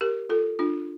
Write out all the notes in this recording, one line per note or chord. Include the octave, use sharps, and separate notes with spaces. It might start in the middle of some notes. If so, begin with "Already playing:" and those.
G4 A#4
F4 A4
D4 F4